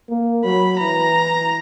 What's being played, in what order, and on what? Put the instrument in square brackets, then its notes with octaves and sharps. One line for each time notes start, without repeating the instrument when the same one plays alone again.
[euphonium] A#3
[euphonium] F#3 [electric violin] B5
[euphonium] E3 [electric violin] A#5